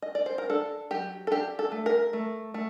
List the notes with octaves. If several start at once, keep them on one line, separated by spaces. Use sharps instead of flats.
D#5
D5
C5
A#4
D4 A4
F#3 G4
A4
D4 G4
A4
A3
A#4
A3
A3